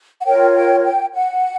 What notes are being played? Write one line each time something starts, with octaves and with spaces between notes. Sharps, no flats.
F#5
F4 A#4 C#5 G5
G5
G5
F#5